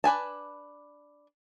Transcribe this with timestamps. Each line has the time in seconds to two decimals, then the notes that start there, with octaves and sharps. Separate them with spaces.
0.04 D4 B4 G#5 A5